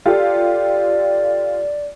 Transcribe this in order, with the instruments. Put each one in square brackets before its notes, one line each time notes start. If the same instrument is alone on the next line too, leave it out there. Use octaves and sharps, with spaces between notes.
[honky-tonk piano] F4 G4 A4 [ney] D5